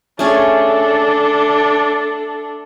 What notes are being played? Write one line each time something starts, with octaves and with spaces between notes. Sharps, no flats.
A3 C#4 D4 G#4 A4